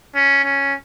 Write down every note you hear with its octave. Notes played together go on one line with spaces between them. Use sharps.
C#4
C#4